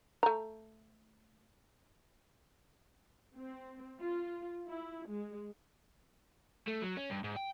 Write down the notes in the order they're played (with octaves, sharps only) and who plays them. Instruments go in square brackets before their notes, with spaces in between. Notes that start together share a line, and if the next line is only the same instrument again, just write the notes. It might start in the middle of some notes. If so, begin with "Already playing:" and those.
[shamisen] A3 A#5
[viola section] C4
F4
E4
G#3
[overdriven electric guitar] A3
F#3
C#4
G2
G#2
G5